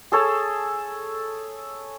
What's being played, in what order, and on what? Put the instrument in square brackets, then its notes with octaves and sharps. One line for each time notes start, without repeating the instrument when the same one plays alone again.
[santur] G#4 A4 C#5 A5